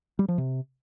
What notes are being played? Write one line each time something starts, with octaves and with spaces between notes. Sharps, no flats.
G3
F3
C3